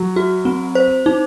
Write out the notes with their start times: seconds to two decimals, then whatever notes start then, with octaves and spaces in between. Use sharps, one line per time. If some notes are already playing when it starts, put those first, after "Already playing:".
Already playing: F#3
0.16 F#4
0.45 C4
0.75 C5
1.06 D#4